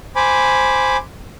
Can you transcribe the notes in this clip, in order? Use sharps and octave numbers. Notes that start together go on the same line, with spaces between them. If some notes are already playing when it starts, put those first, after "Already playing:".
C5 G#5 B5 D6